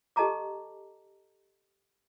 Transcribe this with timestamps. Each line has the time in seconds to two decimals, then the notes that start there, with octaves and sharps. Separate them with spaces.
0.16 G4 A4 D#5 A5 A#5 D6